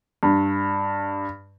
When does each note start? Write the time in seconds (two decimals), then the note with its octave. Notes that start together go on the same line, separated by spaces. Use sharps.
0.23 G2